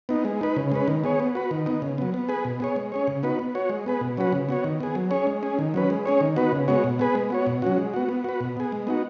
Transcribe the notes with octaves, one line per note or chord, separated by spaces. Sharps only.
B3 D#4
G#3
D#4 B4
C#3
G#3 C#4 B4
D#3
B3 G#4 C#5
B3
F#4 B4
D#3
B3 D#4
C#3
F#3 B3
B3
G#4 B4
B2
B3 G#4 C#5
G#3
C#4 G#4 C#5
C#3
B3 D#4 F#4 B4
B3
F#4 C#5
G#3
B3 G#4 B4
B2
F#3 C#4 F#4 B4
C#3
B3 F#4 C#5
D#3
B3 G#4
F#3
C#4 G#4 C#5
G#3
C#4 G#4
D#3
F#3 C#4 B4
G#3
C#4 G#4 C#5
D#3
B3 D#4 F#4 B4
C#3
G#3 B3 F#4 C#5
B2
B3 G#4 B4
G#3
B3 F#4 C#5
B2
F#3 C#4 F#4
G#3
B3 F#4
B3
F#4 B4
B2
B3 G#4
G#3
B3 D#4 F#4